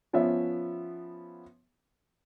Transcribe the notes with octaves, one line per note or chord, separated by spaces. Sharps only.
F3 B3 C#4 E5